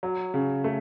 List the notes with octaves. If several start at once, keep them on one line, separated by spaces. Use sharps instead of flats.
F#3
C#3
A3